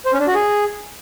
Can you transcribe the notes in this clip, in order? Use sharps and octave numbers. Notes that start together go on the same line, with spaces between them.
C5
C#4
D4
F#4
G#4